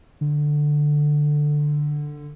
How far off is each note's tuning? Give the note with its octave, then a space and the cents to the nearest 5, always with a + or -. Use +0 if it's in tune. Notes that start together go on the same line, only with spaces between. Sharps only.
D3 +10